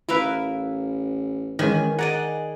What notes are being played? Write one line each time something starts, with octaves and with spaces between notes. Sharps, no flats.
A1 E4 A#4 B4 E5 F5
D#3 E3 G#3 C#4 G#5
G#4 D5 D#5 F#5 A#5